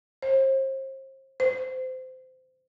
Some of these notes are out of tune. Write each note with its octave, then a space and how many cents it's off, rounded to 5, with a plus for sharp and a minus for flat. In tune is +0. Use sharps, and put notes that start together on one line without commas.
C5 +35
C5 -25